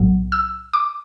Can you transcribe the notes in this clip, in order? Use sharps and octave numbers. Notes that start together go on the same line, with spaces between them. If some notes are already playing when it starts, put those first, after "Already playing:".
Already playing: B1 A2 F#3
E6
D6